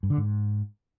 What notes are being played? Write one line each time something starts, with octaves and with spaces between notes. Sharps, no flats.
G2
D3
G#2